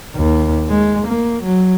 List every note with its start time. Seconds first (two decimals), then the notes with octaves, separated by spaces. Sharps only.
0.16 D#2
0.69 G#3
1.07 A#3
1.43 F#3